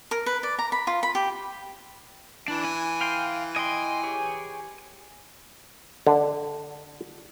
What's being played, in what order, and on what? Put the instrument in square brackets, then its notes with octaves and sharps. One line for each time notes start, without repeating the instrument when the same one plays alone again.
[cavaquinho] A#4
B4
D5
A#5
B5
F4
B5
G4
[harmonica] E3 [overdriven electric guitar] D4
[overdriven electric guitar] G#5
[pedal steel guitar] F5 G5 C6
[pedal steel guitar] D#5 G5 C6 [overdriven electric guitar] G#5
[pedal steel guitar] G4 G#4 C#5
[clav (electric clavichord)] D3